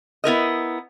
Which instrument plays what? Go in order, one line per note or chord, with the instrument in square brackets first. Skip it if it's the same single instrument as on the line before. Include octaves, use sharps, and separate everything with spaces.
[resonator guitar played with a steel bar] B3 E4 A#4 D#5